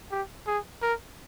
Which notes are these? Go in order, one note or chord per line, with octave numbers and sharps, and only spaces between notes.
G4
G#4
A#4